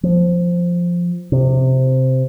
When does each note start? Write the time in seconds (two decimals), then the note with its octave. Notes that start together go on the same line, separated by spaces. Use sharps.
0.03 F3
1.32 C3